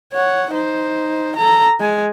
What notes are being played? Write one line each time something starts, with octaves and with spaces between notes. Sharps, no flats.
C#5 F#5
D#4 C5
A4 A#5
G#3 G#5